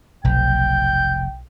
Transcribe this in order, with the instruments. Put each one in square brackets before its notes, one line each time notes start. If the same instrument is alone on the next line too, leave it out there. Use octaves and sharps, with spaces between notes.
[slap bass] F1 [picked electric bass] B1 [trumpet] G5 [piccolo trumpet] G6